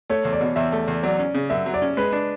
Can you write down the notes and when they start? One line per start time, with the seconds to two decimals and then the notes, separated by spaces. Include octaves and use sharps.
0.10 A3 C#5
0.25 E2
0.32 D5
0.41 B2
0.56 E2 E5
0.72 A3
0.88 E2
1.03 F#3 D5
1.19 C#4
1.34 C#3
1.50 F#2 E5
1.66 F#3
1.74 D5
1.82 C#4
1.97 G#3 B4
2.13 D4